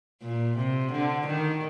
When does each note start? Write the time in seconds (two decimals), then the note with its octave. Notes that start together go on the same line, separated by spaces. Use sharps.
0.22 A#2
0.57 C3
0.92 D3
1.26 D#3